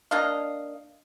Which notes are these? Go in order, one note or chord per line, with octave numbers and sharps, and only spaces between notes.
A#3 D4 D#5 F5